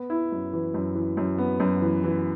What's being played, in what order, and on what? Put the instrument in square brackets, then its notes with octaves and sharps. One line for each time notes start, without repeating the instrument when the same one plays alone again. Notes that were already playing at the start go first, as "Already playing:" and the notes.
Already playing: [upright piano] B3
E4
F#2
E3
F#2
E3
F#2
B3
F#2
E3
E3